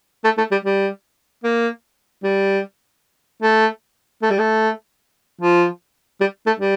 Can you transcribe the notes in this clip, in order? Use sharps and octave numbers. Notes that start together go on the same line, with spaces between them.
A3
A3
G3
G3
A#3
G3
A3
A3
G3
A3
F3
G3
A3
G3